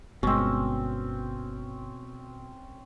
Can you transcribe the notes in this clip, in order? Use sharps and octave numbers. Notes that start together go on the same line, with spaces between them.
G1 B2 G#3 C4 C#4